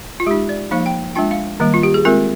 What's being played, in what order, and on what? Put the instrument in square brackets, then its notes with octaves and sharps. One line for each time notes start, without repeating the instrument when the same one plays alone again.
[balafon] F4
G#3 G4
D#4
D5
F3 A#3 D#4 F5
G5
G#3 D4 F4 G5
F5
D#3 G3 A#3
F4
G4
G#4
G#3 C4 F4 A#4